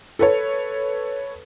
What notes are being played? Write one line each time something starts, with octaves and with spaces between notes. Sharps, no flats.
A4 B4 C#5